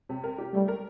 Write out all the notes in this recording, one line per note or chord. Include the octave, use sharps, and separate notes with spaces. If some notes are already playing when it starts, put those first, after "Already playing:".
C3
A#4
G4
G3 A3
A#4